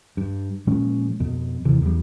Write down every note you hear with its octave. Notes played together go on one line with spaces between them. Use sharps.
G2
A#2 F3 G#3 C#4
F2 B2
D#1 C3 E3
E2 G3